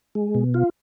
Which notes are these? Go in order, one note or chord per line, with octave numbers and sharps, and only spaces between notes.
G#3
B2
F4